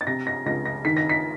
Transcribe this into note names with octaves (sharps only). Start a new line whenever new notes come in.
A6
C3 A#6
A#6
C#2 A#6
A#6
D#3 B6
A#6
B6